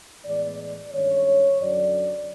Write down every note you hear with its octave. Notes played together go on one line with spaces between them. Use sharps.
A2 E3 G#3 B3 D5
D5
G2 D#3 G#3 C#4 C#5
F#2 D3 F#3 D5